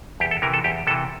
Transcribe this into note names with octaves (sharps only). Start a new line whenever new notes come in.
E2 G4
A4
C3 E3 A#4
A4
E2 G4
C3 E3 A4